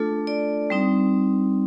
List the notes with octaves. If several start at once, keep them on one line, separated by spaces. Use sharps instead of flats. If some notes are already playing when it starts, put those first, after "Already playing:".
Already playing: A3 D4 F4 A4
D5
G3 C4 D#4